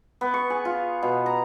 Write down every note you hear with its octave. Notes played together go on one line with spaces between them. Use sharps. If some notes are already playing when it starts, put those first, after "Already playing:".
B3
C#6
G#4
F4
B2
A#5